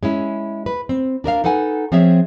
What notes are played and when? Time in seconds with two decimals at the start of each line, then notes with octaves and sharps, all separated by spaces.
0.03 G#3 C#4 E4
0.66 B4
0.89 C4
1.24 D4 A#4 D#5 F5
1.44 D#4 A4 B4 F#5 G#5
1.92 F3 C4 G#4 C#5 E5